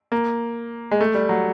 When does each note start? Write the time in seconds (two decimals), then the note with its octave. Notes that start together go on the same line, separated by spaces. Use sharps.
0.12 A#3
0.91 G#3
1.01 A3
1.15 G3
1.29 F#3